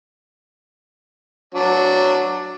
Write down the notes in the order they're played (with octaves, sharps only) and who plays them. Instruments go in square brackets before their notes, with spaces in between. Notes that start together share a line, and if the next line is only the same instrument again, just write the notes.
[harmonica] F#3 D4